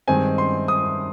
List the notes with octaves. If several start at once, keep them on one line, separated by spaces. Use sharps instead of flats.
G2 D#3 G#3 C4 G#5
C6
D#6